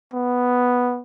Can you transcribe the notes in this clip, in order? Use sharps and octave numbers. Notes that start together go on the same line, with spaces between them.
B3